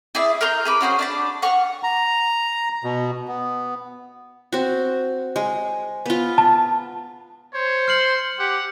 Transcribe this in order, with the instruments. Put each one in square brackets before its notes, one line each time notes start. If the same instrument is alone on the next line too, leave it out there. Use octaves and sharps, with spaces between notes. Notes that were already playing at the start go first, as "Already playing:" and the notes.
[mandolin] E4 G#4 D5 E5
A#4 A#5 C6 G6
G#4 B4 D6
C#4 F#4 G#4 C5
D4 D5 B5
F#5 G#5 C#6 F6
[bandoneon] A#5
B2
B3
[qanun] C4 F#4
G#3
B3 F4
[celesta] A5
[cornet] C5 [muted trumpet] C#5
[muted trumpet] C6 [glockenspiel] F6 C#7 F#7
[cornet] G4 [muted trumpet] F#5